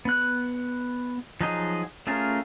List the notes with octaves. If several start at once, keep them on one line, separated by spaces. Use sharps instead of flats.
B3 F#6
F3 F#3 D#4 G#4 D#5
A3 C#4 F4 G#4 A#4